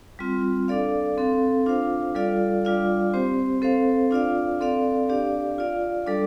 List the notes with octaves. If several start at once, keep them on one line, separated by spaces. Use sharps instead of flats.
G3 C4 F4
D4 A4 D5 F5
C4 A4 F5
D4 F4 C5 F5
G3 F4 A4 D5 F5
G3 D4 F4 D5 F5
C4 G4 C5
C4 A4 C5 F5
D4 F4 D5 F5
C4 A4 D5 F5
D4 G4 D5 F5
F4 D5 F5
G3 D4 A4 D5